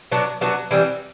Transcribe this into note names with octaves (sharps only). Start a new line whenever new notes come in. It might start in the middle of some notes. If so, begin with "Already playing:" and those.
F#3 B3 D4 F#4
F#3 B3 D4 F#4
E3 G3 C4